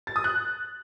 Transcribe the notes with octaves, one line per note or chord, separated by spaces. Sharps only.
A6
D#6
F#6